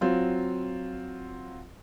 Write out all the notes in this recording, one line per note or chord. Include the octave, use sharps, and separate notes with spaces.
F#3 C4 F4